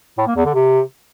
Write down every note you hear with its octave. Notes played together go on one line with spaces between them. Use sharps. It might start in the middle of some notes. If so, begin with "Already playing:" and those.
A2
A#3
E2
D3
C3